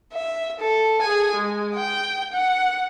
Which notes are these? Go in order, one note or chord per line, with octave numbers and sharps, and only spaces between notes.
E5
A4
G#4 G#5
G#3
G5
F#5